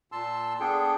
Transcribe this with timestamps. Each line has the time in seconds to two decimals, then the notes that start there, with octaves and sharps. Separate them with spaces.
0.12 A#2 A5 C6 E6
0.60 B3 D4 G#4 A4 G5